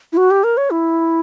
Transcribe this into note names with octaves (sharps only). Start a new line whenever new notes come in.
E4
F#4
G4
A#4
C#5
E4